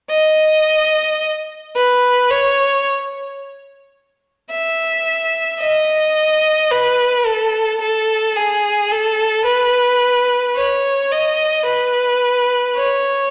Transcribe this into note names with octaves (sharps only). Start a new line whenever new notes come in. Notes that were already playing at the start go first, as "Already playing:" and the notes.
D#5
B4
C#5
E5
D#5
B4
A4
A4
G#4
A4
B4
C#5
D#5
B4
C#5